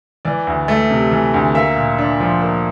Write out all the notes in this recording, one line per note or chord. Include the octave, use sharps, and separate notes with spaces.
E3 D5
D2
A3
C3
E3
D2
A#3 E5
A#2
D4
F3
A#3